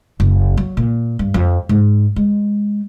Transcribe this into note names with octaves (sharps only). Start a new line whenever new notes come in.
F#1
F#3
A#2
G2
F2
G#2
G#3